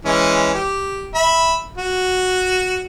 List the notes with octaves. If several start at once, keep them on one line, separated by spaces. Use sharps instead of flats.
E3 G#3 C#4
G4
E5 B5
F#4